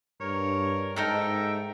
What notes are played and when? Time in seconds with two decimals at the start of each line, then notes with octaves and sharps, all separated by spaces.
0.21 G2 A#4 C#5
0.96 G#2 D#4 A4 A#4 E5 G5